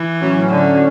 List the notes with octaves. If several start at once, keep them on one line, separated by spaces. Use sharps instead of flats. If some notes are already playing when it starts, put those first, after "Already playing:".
Already playing: E3
A2 F#3 C#4
D3